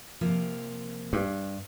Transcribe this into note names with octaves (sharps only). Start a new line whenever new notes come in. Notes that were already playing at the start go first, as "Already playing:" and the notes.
C3 F3 A#3
G2